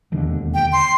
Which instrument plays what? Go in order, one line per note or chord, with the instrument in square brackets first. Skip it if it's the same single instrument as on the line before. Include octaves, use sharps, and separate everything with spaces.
[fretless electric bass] E1 D#2 D3
[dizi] G5
C6